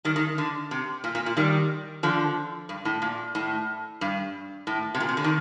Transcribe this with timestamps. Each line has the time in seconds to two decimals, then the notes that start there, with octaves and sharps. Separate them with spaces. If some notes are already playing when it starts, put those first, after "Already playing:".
0.05 D#3 G3
0.16 D#3
0.38 D3
0.71 C3
1.04 A#2
1.15 A#2
1.26 A#2
1.37 D#3 G3
2.03 D3 F3
2.69 G2
2.85 A2
3.02 A#2
3.35 A2
4.01 G2
4.67 A2
4.95 C3
5.00 A#2
5.09 C3
5.17 D3
5.24 D#3